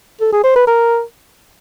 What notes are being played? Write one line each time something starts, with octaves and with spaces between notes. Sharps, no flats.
A4
G#4
C5
B4
A#4